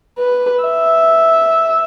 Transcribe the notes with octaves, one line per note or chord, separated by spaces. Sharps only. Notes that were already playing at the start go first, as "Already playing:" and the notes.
B4
E5